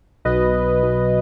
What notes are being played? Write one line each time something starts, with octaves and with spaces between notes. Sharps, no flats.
B1 B2 B4 D#5
B1 B2